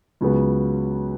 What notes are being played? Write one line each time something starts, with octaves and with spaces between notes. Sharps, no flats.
C#2 C#3 F#3 B3